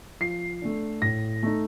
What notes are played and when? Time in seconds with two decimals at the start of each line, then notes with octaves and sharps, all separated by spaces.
0.20 F3 C7
0.62 A3 D4
1.02 A2 A#6
1.43 A3 D#4